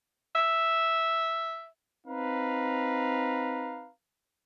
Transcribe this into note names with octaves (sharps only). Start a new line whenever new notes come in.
E5
C4 D#4 B4 F5 A#5